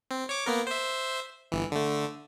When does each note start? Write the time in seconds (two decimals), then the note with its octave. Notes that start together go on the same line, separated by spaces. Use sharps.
0.11 C4
0.29 C#5 D6
0.46 A#3 B3 A#4
0.67 C5 E5
1.52 G1 E3
1.72 D3 A3